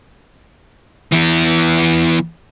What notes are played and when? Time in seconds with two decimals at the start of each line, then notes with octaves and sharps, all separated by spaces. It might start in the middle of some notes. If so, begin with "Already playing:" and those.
1.12 E3 B3